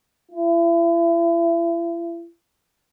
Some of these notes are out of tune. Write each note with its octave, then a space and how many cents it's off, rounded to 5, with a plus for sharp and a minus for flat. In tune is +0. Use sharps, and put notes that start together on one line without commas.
E4 +40